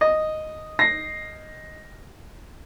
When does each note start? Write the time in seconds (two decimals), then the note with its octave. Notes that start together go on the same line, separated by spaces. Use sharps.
0.01 D#5
0.79 A#6 C7